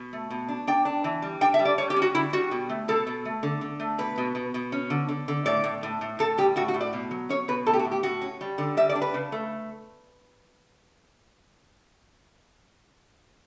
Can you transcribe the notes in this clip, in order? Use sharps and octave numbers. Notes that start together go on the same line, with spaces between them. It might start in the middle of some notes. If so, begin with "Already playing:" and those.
Already playing: B2
A3
B2
D4
D4 G5
D4
E3
G3
D4 G5
E5
G3
D5
G3 C#5
G4
C#4
F#4
D3 E4
G3 F#4
B2
A3
B2 A4
B2
A3
D3
D3
A3
B2 B4
B2
B2
B2
C#4
D3
D3
D3
A2 D5
A2
A2
A2
A2 A4
G3 G4
A2 F#4
F#4
A2
D5
B2
F#3
C#4 C#5
B2 B4
A2 A4
G4
F#4
A2
G4
A2 F#4
C#4
G3
D3
G3 E5
D5
D4
B4
C#3
A3